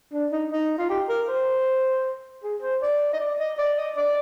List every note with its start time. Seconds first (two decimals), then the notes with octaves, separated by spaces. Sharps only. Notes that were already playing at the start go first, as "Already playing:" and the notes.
0.13 D4
0.32 D#4
0.52 D#4
0.78 F4
0.90 G4
1.09 A#4
1.29 C5
2.44 G#4
2.62 C5
2.82 D5
3.13 D#5
3.20 D5
3.39 D#5
3.58 D5
3.77 D#5
3.97 D5